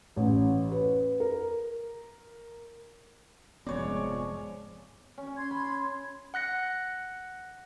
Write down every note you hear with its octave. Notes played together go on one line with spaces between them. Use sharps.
A1
B4
A#4
F1 G#2 F3 G#3 B3 C4 C#5 D5
C#4
C6 G#6
B5
F#5 F#6 A#6 C#7